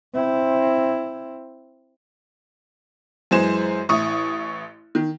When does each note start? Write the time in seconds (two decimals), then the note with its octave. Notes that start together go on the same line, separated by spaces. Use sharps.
0.13 C4 E4
3.31 F#2 E3 G#3 G#4 C5 E7
3.89 A1 E4 C#6 D#6
4.95 D#3